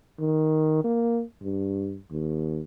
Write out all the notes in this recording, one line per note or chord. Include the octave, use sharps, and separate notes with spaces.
D#3
A#3
G2
D#2